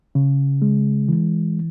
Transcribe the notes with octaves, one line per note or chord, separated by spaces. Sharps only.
C#3
G#3
E3